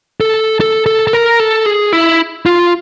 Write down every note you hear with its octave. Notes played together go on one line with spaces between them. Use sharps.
A4
A4
A4
A4
A#4
A4
G#4
E4
F4